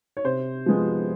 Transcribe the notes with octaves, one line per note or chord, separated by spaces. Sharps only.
C#5
C3 C5
F3 G#3 B3